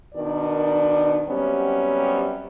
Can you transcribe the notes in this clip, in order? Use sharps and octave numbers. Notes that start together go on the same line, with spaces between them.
B2 D#3 D4 A#4 D5
C3 F#3 G3 B3 C#4